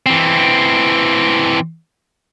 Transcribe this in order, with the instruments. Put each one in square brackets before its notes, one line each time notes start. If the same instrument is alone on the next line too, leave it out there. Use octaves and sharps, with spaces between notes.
[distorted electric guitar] E3 C4